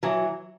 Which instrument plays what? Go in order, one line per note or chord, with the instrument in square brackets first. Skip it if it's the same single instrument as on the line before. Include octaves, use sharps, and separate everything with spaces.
[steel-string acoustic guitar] E3 F#3